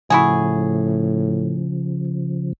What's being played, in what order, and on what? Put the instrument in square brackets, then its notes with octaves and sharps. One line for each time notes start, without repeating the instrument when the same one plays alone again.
[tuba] A2 [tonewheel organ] C#3 F3 [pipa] E4 F#4 G#4